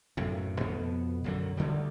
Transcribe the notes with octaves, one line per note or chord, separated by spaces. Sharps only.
B1 F#2 A2
F2 B2 B3
B1 F#2 D3 F#3
D2 D3 E3 G3